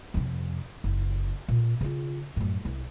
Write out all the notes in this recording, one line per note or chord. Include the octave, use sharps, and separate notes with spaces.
F2 C3
F#1
A#2
C#3 F4
F#2 A2
C2